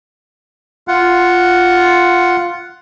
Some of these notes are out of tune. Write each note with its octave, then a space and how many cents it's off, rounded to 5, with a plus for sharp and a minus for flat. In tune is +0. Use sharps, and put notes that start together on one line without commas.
F4 +0 F#5 +0